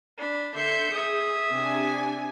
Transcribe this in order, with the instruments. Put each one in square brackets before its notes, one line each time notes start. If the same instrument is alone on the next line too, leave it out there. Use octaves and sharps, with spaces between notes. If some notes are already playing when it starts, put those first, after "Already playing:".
[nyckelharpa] D4 B5
[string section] D3 G6 C#7 [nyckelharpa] E5 C6
[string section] G#4 [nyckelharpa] E5 D#6
[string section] C3 D4 G#5